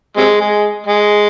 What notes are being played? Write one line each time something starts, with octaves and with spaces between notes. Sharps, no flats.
C3 G#3
G#3
G#3